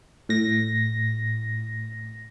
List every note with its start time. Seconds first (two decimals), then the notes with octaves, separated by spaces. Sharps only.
0.29 A2 A#6